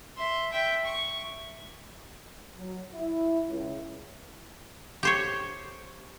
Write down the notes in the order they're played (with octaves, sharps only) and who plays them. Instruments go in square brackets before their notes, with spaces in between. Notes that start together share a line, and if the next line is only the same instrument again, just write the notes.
[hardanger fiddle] E5 C6
E5 G5
C#6
[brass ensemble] F#3
E4
C#2
[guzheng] G4 C5 C#5